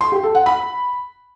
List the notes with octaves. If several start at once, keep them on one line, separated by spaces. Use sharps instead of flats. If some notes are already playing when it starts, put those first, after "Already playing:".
C6
G4
A4
F#5
B5